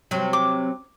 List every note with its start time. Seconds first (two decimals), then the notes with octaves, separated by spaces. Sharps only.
0.11 C3 F#3
0.33 D6